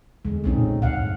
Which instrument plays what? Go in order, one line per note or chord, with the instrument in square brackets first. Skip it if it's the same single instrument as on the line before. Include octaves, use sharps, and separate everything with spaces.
[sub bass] E2 [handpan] D3 G#3
[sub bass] B1 [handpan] C4 C#4 D#4
[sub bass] A#2
[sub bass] D2 [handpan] F5 F#5
[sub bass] G2